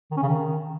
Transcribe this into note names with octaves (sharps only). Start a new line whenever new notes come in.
D#3
C#4
C#3
D#3